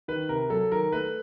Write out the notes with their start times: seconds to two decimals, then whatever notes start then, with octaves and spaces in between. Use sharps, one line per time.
0.08 D#3 B4
0.29 C3 A#4
0.50 F#3 A4
0.72 D#3 A#4
0.92 A3 B4